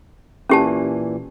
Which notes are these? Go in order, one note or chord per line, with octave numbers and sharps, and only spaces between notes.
A#2 E3 C#4 G4 A5